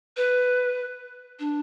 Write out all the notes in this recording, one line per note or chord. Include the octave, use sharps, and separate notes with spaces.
B4
D4